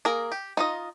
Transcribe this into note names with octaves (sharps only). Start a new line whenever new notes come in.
A#3 G#4 A#4
G4
D#4 F4 D#5